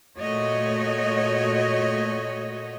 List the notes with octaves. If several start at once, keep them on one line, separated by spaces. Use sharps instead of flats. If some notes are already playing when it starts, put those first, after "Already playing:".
A#2 A3 F#4 C#5 D#5